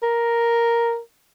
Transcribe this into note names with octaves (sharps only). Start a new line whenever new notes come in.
A#4